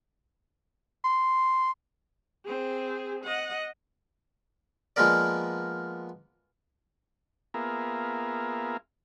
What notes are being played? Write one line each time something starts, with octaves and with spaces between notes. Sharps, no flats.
C6
C4 G#4
D#5 F#5
F3 G#3 A#3 B3 A#4 D5
A#3 B3 F4 G#4 A#4 E5